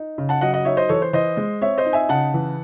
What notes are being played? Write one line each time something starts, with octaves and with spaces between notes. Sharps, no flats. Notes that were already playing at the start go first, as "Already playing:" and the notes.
Already playing: D#4
C#3
F#5 A5
F#3 D#5 F#5
D#5 F#5
D#4 C#5 E5
C5 D#5
E3 A4 C#5
C5
E3 C5 D#5
G#3
C4 C#5 E5
C5 D#5
D#4
E5 G#5
C#3 F#5 A5
E3